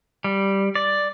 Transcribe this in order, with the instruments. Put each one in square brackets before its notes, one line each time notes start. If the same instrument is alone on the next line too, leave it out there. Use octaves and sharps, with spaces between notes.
[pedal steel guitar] G3
D5